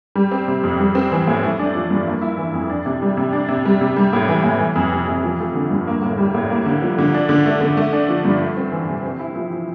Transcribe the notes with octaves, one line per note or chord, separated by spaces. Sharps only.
G3
C4
C3
F2
G3
C4
E3
A2
A3
D4
F3
G2
A#3
E4
E3
F2
D4
C3
G3
C3
D4
C3
G3
C3
G3
A2
E3
A2
E3
F2
C3
F2
F3
A3
D3
G2
A#3
A2
G3
A2
A#3
D3
F3
D3
D4
D3
A3
D3
A3
D4
F3
G2
A3
C4
E3
C3
C4
E4
F3